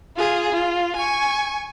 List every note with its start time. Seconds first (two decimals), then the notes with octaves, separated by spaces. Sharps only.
0.17 F4 G#4
0.52 F4
0.96 G#5 C#6